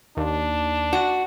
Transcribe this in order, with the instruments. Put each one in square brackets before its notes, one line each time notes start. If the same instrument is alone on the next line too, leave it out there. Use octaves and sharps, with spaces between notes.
[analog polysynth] D#2 [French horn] D4
[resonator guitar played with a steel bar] F#4